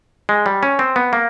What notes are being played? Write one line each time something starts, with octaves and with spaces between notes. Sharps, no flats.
G#3
G3
C#4
C4
B3
A#3